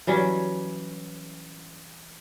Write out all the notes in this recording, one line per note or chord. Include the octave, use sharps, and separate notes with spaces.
E3 F#3 G3 C#4